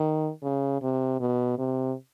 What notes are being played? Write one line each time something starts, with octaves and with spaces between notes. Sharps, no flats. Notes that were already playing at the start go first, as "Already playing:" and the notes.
Already playing: D#3
C#3
C3
B2
C3